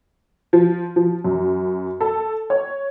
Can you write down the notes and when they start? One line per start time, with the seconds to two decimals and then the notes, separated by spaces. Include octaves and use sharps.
0.53 F3
0.96 F3
1.24 F#2
2.01 A4
2.50 C#5